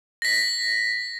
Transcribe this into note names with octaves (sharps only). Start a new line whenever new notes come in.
A#6 B6